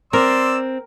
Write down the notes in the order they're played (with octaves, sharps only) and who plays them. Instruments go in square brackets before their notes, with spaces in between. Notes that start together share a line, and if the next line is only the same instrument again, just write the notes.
[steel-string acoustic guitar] C4 [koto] A#4 [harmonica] D5 C6 E6